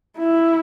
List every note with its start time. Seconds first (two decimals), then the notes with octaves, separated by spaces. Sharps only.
0.18 E4